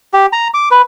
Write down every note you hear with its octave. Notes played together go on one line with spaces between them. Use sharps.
G4
A#5
D6
B4